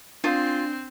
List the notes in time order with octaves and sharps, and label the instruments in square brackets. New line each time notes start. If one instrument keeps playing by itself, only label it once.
[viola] C4 [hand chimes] D4 [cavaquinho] F4